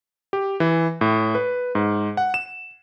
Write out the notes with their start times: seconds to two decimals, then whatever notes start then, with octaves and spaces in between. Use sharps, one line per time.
0.33 G4
0.60 E3
1.01 A2
1.35 B4
1.75 G#2
2.17 F#5
2.34 E7